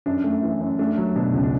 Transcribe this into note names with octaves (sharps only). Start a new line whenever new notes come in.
F#2 D4
A3
E3
F#2
A3 D4
F#3
B2 D4
C#2
D4